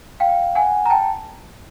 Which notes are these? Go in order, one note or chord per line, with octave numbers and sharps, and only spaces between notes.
F5 G5
F#5 G#5
A#5
G5 A5